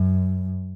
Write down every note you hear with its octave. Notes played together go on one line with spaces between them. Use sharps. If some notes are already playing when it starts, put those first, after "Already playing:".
Already playing: F#2